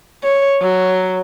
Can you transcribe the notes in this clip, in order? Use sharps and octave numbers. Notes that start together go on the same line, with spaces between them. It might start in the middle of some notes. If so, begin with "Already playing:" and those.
C#5
F#3